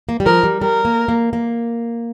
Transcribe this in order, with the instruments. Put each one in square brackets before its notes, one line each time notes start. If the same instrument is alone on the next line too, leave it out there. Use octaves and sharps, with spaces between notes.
[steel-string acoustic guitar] A#3
G3
[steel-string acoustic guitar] F3 [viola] A#4
[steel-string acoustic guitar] G3
[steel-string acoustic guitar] G3 [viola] A#4
[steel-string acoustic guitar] A#3
A#3
A#3